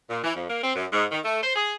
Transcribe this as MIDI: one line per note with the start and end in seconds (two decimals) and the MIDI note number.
0.10 0.19 46
0.24 0.34 52
0.35 0.46 41
0.49 0.59 58
0.64 0.75 60
0.76 0.86 42
0.92 1.05 44
1.11 1.19 51
1.25 1.39 57
1.43 1.53 72
1.56 1.72 68